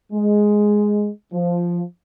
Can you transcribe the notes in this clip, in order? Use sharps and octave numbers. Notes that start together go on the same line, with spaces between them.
G#3
F3